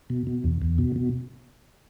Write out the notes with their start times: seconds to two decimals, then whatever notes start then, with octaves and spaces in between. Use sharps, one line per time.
0.10 B2
0.27 B2
0.44 E2
0.62 E2
0.78 B2
0.96 B2